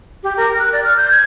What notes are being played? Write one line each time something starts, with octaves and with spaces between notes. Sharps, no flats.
G4
A#4
F#6
D5
F6
G6
G#6